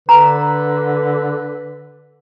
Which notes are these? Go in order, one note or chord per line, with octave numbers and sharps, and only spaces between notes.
D3 B4 A#5